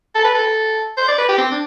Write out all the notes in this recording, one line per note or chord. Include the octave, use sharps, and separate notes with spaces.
A4
B4
A4
C5
D5
B4
G4
C4
D4